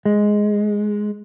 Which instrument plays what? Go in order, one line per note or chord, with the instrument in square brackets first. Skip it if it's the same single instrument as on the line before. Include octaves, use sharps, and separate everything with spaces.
[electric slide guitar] G#3